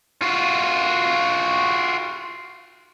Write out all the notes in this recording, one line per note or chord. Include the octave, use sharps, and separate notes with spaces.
F4 F#4